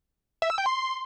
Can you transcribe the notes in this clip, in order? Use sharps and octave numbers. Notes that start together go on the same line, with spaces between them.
E5
E6
G5
C6